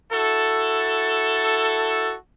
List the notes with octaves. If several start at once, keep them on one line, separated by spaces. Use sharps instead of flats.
E4 F#4 A4